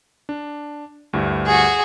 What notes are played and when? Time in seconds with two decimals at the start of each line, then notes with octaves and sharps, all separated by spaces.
0.29 D4
1.13 D2 G2 E4
1.46 F#4 G#4